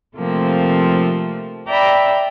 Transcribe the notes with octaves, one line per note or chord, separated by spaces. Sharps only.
C3 F3 A3 A#3 C4
D5 E5 G5 A#5 B5